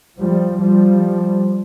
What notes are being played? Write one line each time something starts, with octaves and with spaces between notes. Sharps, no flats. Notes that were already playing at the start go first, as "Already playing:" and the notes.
F3 G3
F3 G3